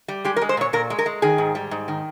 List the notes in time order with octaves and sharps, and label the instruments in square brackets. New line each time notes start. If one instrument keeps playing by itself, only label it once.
[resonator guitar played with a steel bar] G3
G#3 G4
A#4
G#3
C5
A#2 C#5
A#2 A#4
G#3
A#4
G#3
D#3 G#4
G#2
G3
G#2
D#3